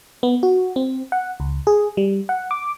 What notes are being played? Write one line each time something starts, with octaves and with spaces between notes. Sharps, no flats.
B3
F#4
C4
F#5
C#2
G#4
G3
F#5
D6